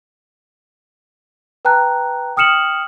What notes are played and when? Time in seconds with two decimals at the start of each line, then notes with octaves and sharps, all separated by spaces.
1.65 B4 G5 A5 A#5 F#6
2.37 G5 D#6 F6 C#7 E7 F#7